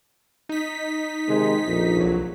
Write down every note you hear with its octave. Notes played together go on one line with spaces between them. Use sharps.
D#4 B6
C3 D#3 G#3
A#1 F2 A#2
C2 F#3